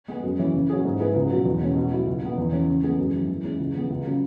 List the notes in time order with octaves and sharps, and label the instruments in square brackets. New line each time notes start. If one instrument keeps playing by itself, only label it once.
[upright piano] G#3 B3
F#2
E3 C#4
C#3
F#3 C#4 E4 G#4
G#2
G#3 E4 G#4 B4
C#2
B2 F#3
E2
B2 G#3 C#4
B2
F#3 E4
C#2
B2 G#3 B3
E2
E3 C#4
C#3
E3 G#3 B3 G#4
F#2
E3 G#3
E3
G#3 C#4 E4 G#4
C#2
C#3 E3 B3 G#4
C#2
C#3 F#3